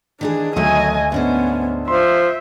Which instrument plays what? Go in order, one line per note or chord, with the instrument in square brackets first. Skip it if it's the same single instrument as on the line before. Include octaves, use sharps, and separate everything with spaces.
[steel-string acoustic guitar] D#3 E3 G#4 [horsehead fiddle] D4
[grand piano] D2 [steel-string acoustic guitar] D#3 F#3 A3 [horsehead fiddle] D#5 G#5
[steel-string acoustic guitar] G#2 D4 C5 [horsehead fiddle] B3 C#4
[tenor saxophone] F3 [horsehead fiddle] E5 [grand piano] C6